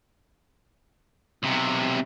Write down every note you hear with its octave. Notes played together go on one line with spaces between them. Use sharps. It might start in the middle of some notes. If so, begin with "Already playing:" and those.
B1 C3